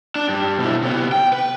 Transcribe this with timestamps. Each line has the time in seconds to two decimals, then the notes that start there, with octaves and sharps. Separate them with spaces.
0.16 D4
0.28 G2
0.59 B2 E4
0.82 C3 B3
1.12 G5
1.33 B4